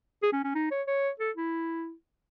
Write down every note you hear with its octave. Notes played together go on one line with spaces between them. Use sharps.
G#4
C#4
C#4
D#4
C#5
C#5
A4
E4